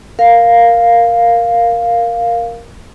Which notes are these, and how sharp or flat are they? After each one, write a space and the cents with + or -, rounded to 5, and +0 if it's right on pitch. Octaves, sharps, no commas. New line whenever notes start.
A#4 +0 F5 +0